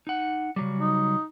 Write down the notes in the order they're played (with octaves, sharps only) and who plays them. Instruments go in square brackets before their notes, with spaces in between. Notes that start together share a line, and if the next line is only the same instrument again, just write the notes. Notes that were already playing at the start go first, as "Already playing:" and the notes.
[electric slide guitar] D#4 F#5
C#3 F#3 G3
[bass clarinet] D#4